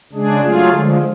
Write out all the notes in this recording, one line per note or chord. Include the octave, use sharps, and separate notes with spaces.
C#3 G#3 D4 G#4
F#3 A3 F4 G#4
D3 F3 G#3